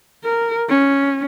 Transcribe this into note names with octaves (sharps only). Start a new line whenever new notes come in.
A#4
C#4